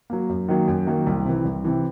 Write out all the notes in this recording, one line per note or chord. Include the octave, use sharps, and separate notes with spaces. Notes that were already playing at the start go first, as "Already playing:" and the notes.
F#3 A#3
F#2
D#3 F#3 A#3
F#2
D#3 F#3 A#3
C2
C3 E3
C2
C3 E3